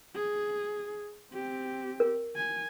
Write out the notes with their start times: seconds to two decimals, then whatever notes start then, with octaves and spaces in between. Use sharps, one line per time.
0.15 G#4
1.31 C4 G4
2.00 A#4
2.36 G#5